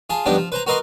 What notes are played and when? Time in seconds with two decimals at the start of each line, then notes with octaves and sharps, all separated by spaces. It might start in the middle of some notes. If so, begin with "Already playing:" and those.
0.10 F4 G#4 A5
0.26 G2 F3 B3 D4 D#4 G4
0.37 F3
0.52 B4 C5 A#5
0.67 F#4 A#4 B4 D#5 C6